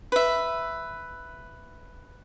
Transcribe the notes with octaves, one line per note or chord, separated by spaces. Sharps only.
B4 E5